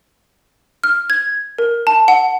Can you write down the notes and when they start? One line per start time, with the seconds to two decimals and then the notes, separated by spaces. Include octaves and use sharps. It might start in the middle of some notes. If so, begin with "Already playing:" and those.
0.84 F6
1.10 G#6
1.58 A#4
1.87 A5
2.08 F#5